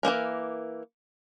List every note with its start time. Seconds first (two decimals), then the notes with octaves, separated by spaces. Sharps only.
0.03 E3 F3 A#3 A#4